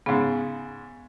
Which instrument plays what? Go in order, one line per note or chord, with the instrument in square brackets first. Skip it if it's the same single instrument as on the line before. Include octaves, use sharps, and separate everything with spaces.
[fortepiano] G#2 C#3 [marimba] B3